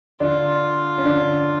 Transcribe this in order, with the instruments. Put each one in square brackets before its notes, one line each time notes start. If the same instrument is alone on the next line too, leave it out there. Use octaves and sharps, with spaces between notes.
[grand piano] D3 D4 [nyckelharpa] F4
[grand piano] C#4
D3 D4